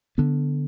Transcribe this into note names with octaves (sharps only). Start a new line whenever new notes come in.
D3 B3